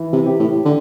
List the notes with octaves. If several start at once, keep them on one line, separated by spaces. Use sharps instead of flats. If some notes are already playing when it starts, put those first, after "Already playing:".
Already playing: E3
C3
G4
A2
D3